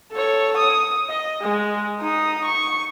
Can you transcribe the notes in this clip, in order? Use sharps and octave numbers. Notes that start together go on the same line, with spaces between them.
A4 C#5
D#6
D#5
G#3
D#4 D#6
C#6